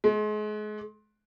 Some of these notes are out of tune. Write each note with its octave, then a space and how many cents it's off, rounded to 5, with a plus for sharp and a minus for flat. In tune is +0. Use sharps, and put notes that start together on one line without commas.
G#3 +35